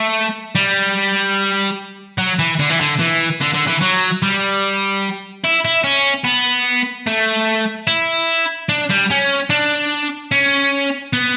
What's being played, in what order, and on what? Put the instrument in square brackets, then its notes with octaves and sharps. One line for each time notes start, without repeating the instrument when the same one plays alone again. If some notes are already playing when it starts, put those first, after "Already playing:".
Already playing: [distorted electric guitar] A3
G3
F#3
E3
D3
E3
D3
E3
D3
D3
E3
F#3
G3
E4
E4
C#4
B3
A3
E4
D4
G3
C#4
D4
C#4
B3